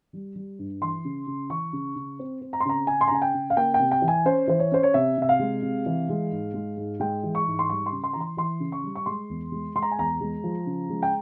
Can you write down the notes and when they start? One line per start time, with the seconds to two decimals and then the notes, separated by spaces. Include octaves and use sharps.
0.13 G3
0.35 G3
0.59 G2
0.81 E3 C6
1.05 C#3
1.27 C#3
1.50 E3 C#6
1.73 C#3
1.96 C#3
2.19 C4
2.41 C4
2.53 A#5
2.60 C6
2.65 C#3 A#5
2.87 C#3 G#5
3.01 C6
3.08 A#5
3.11 C#3 G#5
3.22 G5
3.34 C#3
3.50 F5
3.57 A#3 G5
3.74 G5
3.80 C3
3.91 G5
4.02 E3
4.08 G#5
4.25 C#4 C5
4.48 E3 C5
4.59 C#5
4.72 C#4 C5
4.83 C#5
4.94 C3 E5
5.18 C3 E5
5.29 F5
5.39 G#3
5.62 C3
5.86 E3
6.09 G#3
6.32 G#2
6.54 G#3
6.77 G#2
7.00 G#3 G5
7.23 E3
7.35 C#6
7.47 G#2
7.59 C6
7.69 G3 C#6
7.86 C6
7.92 C#3
8.04 C6
8.13 E3 A#5
8.20 C6
8.37 E3 C6
8.60 C#3
8.72 C#6
8.83 G3
8.95 C#6
9.06 G#3 C6
9.29 E2
9.52 G#3
9.75 G#3 C6
9.82 A#5
9.91 G#5
9.98 E2 A#5
10.21 G#3
10.44 F3
10.66 C#3
10.89 G#3
11.03 G5